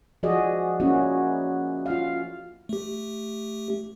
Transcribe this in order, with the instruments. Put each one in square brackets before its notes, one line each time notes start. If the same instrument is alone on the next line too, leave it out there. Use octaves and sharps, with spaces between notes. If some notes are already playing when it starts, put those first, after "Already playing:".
[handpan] F3 F#4 G#4 D5 D#5
A#3 C#4 E4 F#4
F4 F5
[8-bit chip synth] A3 G4